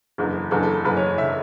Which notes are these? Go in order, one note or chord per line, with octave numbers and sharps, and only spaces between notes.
F#1 E2 D3
F#1 E2 D3 A4
A4
A4
F#1 E2 D3 B4
C#5
E5
D3